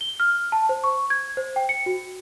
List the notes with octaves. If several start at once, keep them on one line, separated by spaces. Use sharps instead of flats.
G7
F6
A5
C5
C#6
G#6
C5
G5
C#7
F#4